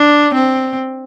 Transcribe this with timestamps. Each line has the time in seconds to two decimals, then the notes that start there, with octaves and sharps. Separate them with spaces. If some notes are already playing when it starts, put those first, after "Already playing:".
Already playing: D4
0.34 C4